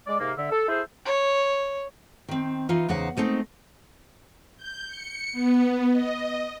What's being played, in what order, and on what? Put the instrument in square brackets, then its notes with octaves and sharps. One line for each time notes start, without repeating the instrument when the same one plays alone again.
[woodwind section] G#3 D5
G#2 C3 A#3
D3 E5
A4
E4 G#4 A4 C5
[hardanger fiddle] C#5
[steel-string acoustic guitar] D#3 C4
E3 D#4 F4
E2 C#3 D#4 C5 F#5
G#3 A3 C4 D#4
[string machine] G6
C#7
B3
D#5